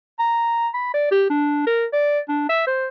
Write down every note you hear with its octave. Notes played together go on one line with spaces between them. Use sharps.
A#5
B5
D5
G4
D4
A#4
D5
D4
E5
C5